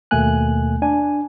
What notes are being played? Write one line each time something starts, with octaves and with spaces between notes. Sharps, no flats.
D#2 B2 A3 A#3 G#5 F#6
D4 G#5